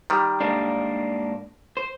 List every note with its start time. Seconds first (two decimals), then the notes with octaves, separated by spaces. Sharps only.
0.10 D#3 G3
0.40 G#2 A#3 D4
1.77 C5